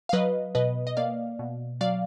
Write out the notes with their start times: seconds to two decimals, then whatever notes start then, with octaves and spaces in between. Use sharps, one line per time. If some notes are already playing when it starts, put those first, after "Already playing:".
0.09 F5
0.13 F#3 B4 D#5
0.55 B2 B4 D#5
0.87 D#5
0.97 A#3 D5 F5
1.39 B2
1.81 F#3 D5 F5